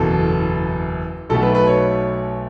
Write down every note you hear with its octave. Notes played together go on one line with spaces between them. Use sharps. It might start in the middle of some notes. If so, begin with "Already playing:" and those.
Already playing: F#1 E2 B2 A4
B1 B2 F#3 A3 A4
B4
B4
C#5